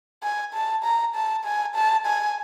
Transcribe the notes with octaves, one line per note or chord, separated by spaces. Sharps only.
G#5
A5
A#5
A5
G#5
A5
G#5